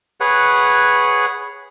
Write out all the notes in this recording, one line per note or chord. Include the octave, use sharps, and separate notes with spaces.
G#4 B4 C#5 F#5